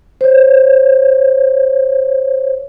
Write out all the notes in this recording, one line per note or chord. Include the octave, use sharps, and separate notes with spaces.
C5 C#5